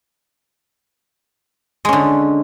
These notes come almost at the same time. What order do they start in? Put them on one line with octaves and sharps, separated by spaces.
G#3 C#4 D3